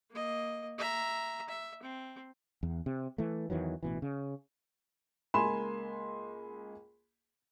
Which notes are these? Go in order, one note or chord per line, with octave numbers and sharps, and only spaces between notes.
A#3 D#5
E5 A#5
E5
C4
E2
C3
E3 A3
E2 D#3 E3 F#3
A1 B2 E3
C#3
C#2 A#3 G#5 B5 C6 E7